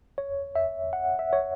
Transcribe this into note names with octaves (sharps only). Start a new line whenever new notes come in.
C#5
E5
F#5
E5
C#5